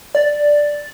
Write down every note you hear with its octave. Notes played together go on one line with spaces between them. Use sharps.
D5